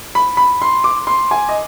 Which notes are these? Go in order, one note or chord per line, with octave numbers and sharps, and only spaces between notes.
B5
B5
C6
D6
C6
G#5
D#5